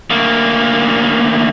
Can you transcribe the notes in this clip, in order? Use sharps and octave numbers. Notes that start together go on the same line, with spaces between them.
D2 A#3